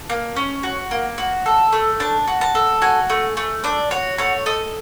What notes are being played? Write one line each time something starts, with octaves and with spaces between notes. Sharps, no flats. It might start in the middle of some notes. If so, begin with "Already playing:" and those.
Already playing: A5
A#3
C#4
F#4
A#3
F#4
A4
A3
D4 A5
F#4
A5
A4
F#4 G#5
A3
A3
D4 D5
F#4 C#5
A3 C#5
A4 D#5